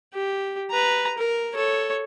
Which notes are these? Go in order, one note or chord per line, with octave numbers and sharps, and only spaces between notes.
G4
B4 A#5
A#4
A4 C#5